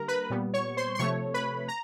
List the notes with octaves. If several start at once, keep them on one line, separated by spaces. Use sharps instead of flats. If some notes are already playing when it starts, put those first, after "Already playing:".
Already playing: D3 G3 A#3 A#4 A#5
B4 B5
A#2 G3 B3
C#5 C#6
C5 C6
C6
C3 F3 A3 C#5 C#6
B4 B5
A#5